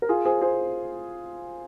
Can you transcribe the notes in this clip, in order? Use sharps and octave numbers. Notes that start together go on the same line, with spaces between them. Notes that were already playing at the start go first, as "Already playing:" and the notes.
A#4
F4 G#4
G#4 C5
G#4 C5